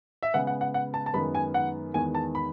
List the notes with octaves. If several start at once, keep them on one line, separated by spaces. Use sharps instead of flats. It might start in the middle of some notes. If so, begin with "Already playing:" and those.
E5
C#3 G#3 B3 F#5
F#5
F#5
F#5
A5
A5
F#2 D#3 G#3 B3 B5
G#5
F#5
E2 D#3 G#3 B3 G#5
A5
B5